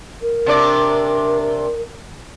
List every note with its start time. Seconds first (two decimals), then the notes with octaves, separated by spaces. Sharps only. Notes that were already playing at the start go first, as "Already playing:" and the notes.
0.22 A#4
0.46 C3 D4 D5